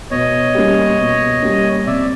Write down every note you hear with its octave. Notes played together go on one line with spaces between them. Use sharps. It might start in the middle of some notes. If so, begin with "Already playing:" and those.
B2 C#5 D#5
G3 A#3 C#4
B2
G3 A#3 C#4
C3 D5 E5